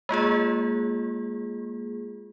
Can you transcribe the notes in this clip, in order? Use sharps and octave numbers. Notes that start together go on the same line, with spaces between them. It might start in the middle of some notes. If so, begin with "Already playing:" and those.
G#3 A#3 F4 G#4